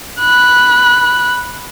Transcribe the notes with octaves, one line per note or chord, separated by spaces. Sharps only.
B5 F#6